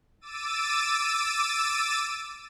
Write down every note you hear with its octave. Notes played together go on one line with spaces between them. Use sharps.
D6 E6 A6 D#7